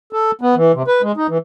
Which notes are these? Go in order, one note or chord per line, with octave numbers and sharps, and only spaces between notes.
A4
B3
E3
C3
B4
G#3
D#4
E3